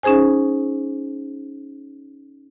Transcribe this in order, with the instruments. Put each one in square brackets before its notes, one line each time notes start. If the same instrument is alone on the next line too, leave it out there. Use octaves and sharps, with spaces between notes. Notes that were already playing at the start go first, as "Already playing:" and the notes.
[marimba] C#4 D#4 G#4 C5 G#5